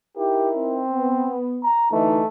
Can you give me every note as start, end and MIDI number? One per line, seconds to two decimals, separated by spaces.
0.17 0.85 63
0.17 0.85 64
0.17 0.49 67
0.17 0.85 70
0.56 1.33 60
0.91 1.64 59
1.63 1.90 82
1.92 2.21 38
1.92 2.21 52
1.92 2.27 57
1.92 2.21 63